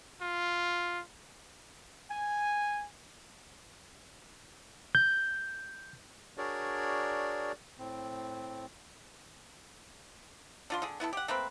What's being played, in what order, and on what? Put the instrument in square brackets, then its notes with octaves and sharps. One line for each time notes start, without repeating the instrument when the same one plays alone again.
[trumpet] F4
[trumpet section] G#5
[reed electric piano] G6
[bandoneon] D4 F#4 G#4 A#4 C#5 D5
A2 C4
[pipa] D3 F4 C6
D3 G#4
B3 E4 F4 A4
G4 F#5
A3 A#3 C4 B4